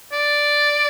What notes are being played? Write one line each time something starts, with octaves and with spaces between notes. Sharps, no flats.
D5